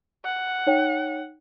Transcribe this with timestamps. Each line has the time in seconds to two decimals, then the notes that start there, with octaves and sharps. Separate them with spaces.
0.25 F#5
0.67 D#4 C#5 G5